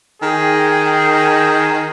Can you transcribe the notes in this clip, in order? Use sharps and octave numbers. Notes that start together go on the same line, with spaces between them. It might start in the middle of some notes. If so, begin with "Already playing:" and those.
D#3 G#4 G5